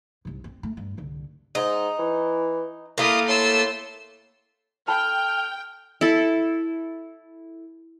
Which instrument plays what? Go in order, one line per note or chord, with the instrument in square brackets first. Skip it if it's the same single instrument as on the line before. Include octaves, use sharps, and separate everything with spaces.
[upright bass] C2 G#2
C4
A3
G2
C2 D3
[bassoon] G#2 [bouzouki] D#4
[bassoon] E3
[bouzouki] A3 A#3 [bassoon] E4 [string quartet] D#5 F5 D#6
[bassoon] A2 [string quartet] A5 C6 E6
[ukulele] A4 A5 B5 [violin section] G5 [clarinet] F6
[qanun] E4 A4